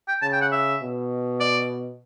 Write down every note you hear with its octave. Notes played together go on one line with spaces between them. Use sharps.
G5
C#3 A5
G5
F#5
E5
B2
D5